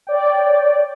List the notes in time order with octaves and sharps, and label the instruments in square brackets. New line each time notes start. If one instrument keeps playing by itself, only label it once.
[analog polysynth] C#5 D5 G5